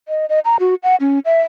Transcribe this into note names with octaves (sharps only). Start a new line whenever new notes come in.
D#5
D#5
A#5
F#4
F#5
C#4
E5